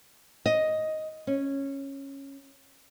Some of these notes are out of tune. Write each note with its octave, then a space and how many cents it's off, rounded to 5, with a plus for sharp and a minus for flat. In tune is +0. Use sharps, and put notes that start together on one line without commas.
D#5 +5
C#4 -10